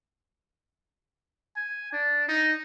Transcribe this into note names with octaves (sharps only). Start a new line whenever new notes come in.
G#5
D4
D#4